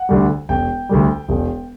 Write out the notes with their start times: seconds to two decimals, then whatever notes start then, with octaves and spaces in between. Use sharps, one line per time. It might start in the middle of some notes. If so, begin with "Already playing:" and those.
Already playing: F#5
0.09 D2 D3 G3
0.49 E1 G5
0.89 D2 D3 G3
1.29 E1